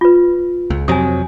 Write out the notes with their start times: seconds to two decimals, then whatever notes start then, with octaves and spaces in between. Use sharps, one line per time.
0.01 F4 B4
0.70 C#2
0.88 F2 C3 F#3 G#5 D#6